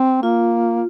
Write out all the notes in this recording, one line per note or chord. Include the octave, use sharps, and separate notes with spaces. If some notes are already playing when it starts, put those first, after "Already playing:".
Already playing: C4
A#3 F4